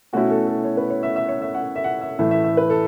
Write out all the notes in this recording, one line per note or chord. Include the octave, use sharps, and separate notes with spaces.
B2 A3 C#4 E4 F#4
A4
A4
C#5
B4
C#5
E5
E5
C#5
E5
F#5
E5
F#5
E5
A2 E3 A3 E5
E5
E5
B4
A4